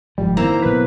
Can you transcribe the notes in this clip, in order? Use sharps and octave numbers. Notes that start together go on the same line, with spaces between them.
F#1 G#2 F3 G3
D#3 A#3 C4 E4 A#5
B2 F#3 B4